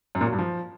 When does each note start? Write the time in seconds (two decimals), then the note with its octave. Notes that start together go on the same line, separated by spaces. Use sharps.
0.15 F#2
0.21 A#2
0.27 F#3
0.33 G2
0.39 F3